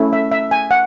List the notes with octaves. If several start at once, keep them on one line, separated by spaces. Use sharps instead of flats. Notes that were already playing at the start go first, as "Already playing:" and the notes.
Already playing: A3 C#4 E4
E5
E5
G#5
F#5